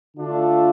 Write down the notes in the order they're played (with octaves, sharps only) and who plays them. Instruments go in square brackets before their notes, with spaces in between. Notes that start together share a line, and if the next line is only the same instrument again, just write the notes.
[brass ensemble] D3 A3 D4 F4 A4